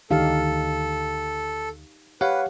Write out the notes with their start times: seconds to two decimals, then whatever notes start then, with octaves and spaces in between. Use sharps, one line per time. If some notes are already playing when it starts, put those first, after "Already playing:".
0.11 D2 D#3 D4 D#4 G4 A4 F5
2.21 G4 B4 C#5 F5 F#5